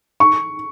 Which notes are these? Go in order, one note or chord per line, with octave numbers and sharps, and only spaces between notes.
C#6